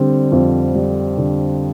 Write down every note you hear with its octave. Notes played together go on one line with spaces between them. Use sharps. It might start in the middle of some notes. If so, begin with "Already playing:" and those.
Already playing: D3 G3 C4
F2
G3
D3